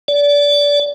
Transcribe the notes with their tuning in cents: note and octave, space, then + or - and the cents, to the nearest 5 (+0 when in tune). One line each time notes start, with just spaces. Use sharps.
D5 -25